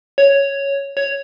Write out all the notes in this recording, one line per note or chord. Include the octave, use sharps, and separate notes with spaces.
C#5
C#5